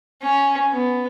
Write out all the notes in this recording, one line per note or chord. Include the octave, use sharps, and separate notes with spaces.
C#4
B3